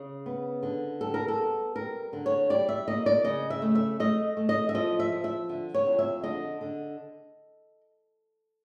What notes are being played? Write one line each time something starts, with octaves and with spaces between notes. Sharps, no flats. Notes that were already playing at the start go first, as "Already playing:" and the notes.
Already playing: C#3
B3
D3
G3 A4
A#4
A4
B3
G3 A#4
D3
C#5
G3 D5
E5
A#3 D#5
D5
C#3 D#5
E5
A3
E5
A3 D#5
A3
D#5
E5
F3 D#5
E5
F3
E5
D3
C#5
F2
E5
D3 D#5
D3